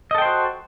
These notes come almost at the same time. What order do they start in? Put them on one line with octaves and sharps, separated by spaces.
D#5 A4 G5 C5 F#4